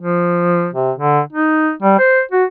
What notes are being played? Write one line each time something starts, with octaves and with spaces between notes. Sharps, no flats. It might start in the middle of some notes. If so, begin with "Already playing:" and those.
F3
C3
D3
D#4
G3
C5
F#4